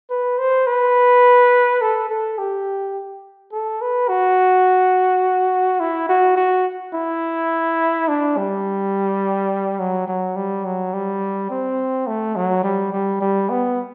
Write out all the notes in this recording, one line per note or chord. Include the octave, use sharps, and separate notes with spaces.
B4
C5
B4
A4
A4
G4
A4
B4
F#4
E4
F#4
F#4
E4
D4
G3
F#3
F#3
G3
F#3
G3
C4
A3
F#3
G3
G3
G3
B3